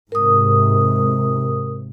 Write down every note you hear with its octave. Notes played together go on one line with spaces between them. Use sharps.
G#2 C3 A#4 D#6